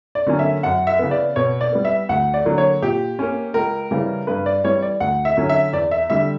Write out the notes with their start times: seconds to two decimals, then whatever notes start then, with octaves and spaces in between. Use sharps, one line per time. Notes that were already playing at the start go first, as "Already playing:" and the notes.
0.15 D5
0.27 D3 F#3 A#3 C#4
0.39 E5
0.63 F#2 F#5
0.87 E5
0.99 C#3 E3 B3
1.11 D5
1.36 B2 C#5
1.61 D5
1.72 G3 B3
1.85 E5
2.09 D2 F#5
2.34 D5
2.45 D3 F#3 A#3
2.58 C#5
2.82 A#2 G4
3.19 A#3 C#4
3.54 C#2 A#4
3.91 C#3 E3 G3
4.27 G2 B4
4.46 D5
4.64 E3 G3 C#5
4.82 D5
5.00 D2 F#5
5.25 E5
5.37 D3 F#3 C#4
5.49 E5
5.73 E2 D5
5.91 E5
6.10 D3 G3 E5